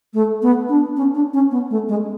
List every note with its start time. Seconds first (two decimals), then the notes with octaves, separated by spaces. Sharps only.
0.14 A3
0.42 B3
0.69 D4
0.97 C#4
1.15 D4
1.34 C#4
1.51 B3
1.70 A3
1.89 G#3